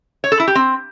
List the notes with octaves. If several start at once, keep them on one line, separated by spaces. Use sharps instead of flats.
C#5
A4
E4
G4
C4